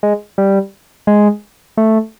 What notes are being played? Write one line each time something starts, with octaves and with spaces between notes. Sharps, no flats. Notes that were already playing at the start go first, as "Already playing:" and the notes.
G#3
G3
G#3
A3